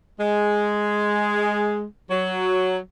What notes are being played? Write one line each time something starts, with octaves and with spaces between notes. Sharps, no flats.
G#3
F#3